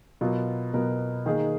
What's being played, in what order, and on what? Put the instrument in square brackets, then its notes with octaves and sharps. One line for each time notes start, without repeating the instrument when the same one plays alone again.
[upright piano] B2 F#3 B3 F4 A#4
B2 F#3 B3 F4 A#4
D#3 A#3 D#4 G#4